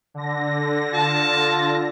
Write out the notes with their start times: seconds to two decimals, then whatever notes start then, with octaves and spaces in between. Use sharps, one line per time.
0.14 D3 A#6
0.94 F4 A5